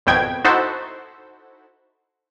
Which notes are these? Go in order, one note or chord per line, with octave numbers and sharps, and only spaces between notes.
G#1 F2 B2 G5 G#6
D#4 E4 F#4 A4 C5